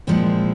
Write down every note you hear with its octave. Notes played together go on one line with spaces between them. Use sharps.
A#2 F3 G#3 C4 E4